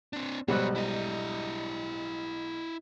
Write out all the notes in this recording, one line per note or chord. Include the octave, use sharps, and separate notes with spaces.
C4 D4
B1 G#2 B2 F3 G3 C5 C#5 F#6
E4 D#5